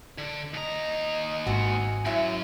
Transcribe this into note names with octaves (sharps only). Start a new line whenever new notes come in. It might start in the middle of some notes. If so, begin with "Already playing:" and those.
D3
D#2 D#5 A#5
G#1 B3 C4 F#4 G#5
F#2 A#2 F#3 E4 E5